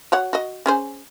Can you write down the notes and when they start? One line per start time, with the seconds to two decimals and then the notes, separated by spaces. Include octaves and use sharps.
0.12 F#4 C#5 F#5
0.33 F#4 D#5
0.66 C#4 G#4 C5